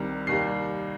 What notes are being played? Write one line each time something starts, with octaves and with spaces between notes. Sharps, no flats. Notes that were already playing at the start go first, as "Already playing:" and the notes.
Already playing: C2 C3 D#3 G3
D#2 D#3 G3 C7